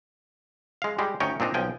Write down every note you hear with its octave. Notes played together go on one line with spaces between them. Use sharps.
G#3 F5
G3 G#3 G4
D2 C#4 D#4 C#5 G5
A#2 C4 D4 D#4
B1 F3 G5 G#5